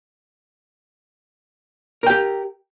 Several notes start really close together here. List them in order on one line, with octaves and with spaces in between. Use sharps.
A#4 G5 G4